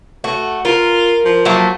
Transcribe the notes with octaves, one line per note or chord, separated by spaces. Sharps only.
A3 F#4
F4 A#4
F3
F#3 A3 A#3